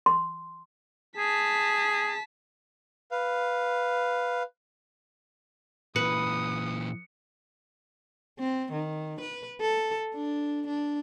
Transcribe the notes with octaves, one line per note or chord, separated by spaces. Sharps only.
C6
G#4 A5 B6
B4 F5
A#2 E3 B4 D#6 C#7
C4
D#3
B4
A4
D4
D4